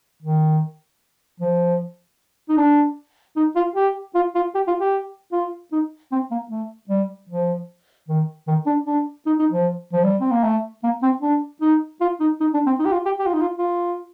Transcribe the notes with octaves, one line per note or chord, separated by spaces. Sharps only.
D#3
F3
D#4
D4
D#4
F4
G4
F4
F4
G4
F4
G4
F4
D#4
C4
A#3
A3
G3
F3
D#3
D#3
D4
D4
D#4
D#4
F3
F3
G3
C4
A#3
A3
A#3
C4
D4
D#4
F4
D#4
D#4
D4
C4
D#4
G4
F4
G4
G4
F4
D#4
F4
F4